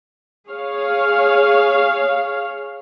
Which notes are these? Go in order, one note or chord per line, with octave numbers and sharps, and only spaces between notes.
G#4 C#5 F5